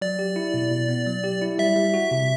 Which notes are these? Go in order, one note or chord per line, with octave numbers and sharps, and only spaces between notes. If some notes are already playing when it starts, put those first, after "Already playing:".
F#3 D5
G4
E4
B2
B2
B3
F#3
G4
E4
G3 E5
G3
F#4
C3